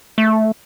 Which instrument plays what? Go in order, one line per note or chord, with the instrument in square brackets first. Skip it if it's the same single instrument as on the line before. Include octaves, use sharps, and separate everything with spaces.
[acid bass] A3